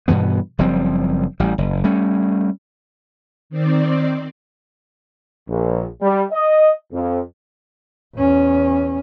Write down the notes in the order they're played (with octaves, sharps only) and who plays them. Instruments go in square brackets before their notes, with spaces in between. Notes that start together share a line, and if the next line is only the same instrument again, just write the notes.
[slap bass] G2 B2 E3 B3
F#1 F3 G3 C4
A1 G3
F#1
G3 A3 C#4
[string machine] D#3 C4 D5
[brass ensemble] A#1
G3
D#5
F2
[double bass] E2 C#4